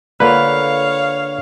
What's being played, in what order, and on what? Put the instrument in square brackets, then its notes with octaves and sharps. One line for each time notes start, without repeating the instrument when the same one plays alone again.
[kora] D3 A#3 F4 [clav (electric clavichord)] B4 [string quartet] C#5 F5